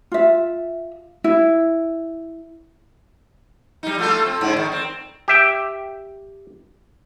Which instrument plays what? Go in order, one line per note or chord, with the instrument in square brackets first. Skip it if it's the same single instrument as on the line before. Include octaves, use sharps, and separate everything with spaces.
[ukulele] F4 E5
E4
[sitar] G3 D#4
A3 F4 A4
C4
G#2 D3 D4
D#3
C4
[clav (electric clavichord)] G4 E5 G5